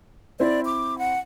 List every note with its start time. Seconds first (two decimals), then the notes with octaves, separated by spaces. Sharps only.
0.40 C4 E4 D5
0.66 D6
0.98 F#5